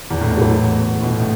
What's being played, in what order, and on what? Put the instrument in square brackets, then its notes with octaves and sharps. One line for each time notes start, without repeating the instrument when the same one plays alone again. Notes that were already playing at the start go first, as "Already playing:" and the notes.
[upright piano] E2
A2
B2
F#3
E3
A2
B2
A2